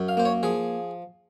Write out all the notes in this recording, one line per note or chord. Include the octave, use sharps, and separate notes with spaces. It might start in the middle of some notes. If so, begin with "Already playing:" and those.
Already playing: F#2
F5
A#3 C5
C#5
F3 G#4